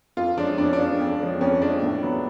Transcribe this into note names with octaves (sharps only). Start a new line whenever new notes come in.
F2 F4
F3 G#3 C#4 D4
F2 D4
C#4
D4
F3 G#3 C#4
F2
F3 G#3 C#4
F2 C#4
F3 G#3 C#4 D4
A2
F#3 B3